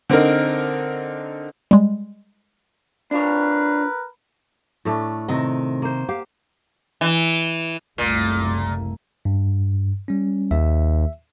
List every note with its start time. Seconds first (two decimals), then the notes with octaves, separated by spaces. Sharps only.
0.10 D3 C4 D#4 A#4
1.71 G3 G#3
3.11 D4 F4 A#4 B4 C#5
4.85 A2 A3 D4
5.28 C3 D#3 D#5
5.82 A#3 C5
6.09 G4 F5
7.01 E3
7.98 F#1 C2 A#2 A3
9.25 G2
10.08 G3 C#4
10.51 D#2 E5